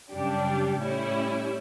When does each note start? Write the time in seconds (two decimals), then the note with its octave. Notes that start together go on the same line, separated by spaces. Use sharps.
0.11 F#2 C#3 G3 D4 G4
0.80 A2 G3 C#4 E4